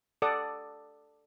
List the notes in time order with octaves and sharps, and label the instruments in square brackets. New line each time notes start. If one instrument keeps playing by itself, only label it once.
[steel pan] A4 D5 F#5 D#6